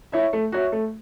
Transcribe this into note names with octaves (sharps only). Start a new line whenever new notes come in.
E4 C#5 E5
A3
F#4 C#5 E5
A3